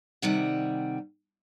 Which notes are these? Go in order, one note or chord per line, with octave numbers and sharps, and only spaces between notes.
C3 D#3 G3 F#5